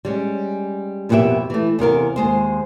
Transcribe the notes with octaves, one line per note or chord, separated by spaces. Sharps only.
G3 G#3 C#4
F2 B2 A#3 F#4 G4 E5
E3 A3
E2 C3 A#4 F5
D#2 G#3 C5